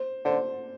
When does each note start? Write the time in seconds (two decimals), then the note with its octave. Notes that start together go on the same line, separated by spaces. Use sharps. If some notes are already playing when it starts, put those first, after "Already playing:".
Already playing: C5
0.25 D3 C5